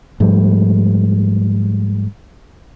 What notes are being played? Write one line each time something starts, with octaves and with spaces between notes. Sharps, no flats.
G#2 F3 G3 A3